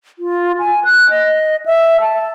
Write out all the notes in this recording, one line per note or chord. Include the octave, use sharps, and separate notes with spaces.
F4
G#5
F#6
D#5
E5
A5